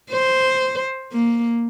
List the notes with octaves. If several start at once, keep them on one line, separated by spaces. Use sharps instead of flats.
C5
A#3